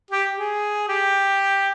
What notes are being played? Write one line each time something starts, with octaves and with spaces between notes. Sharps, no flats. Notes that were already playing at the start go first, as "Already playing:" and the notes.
G4
G#4
G4